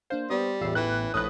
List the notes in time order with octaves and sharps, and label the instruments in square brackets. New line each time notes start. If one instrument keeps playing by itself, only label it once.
[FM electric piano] A#3 D4 F5 [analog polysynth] C5
[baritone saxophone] G3 [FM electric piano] B3 D5 D#6
[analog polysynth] A1 E2 A2 [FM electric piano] F4 E6 C7
[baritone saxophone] E3 [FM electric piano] G5 [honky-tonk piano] F#6
[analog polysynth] A#1 B4 [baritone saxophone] A2 [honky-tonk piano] D#6 F#6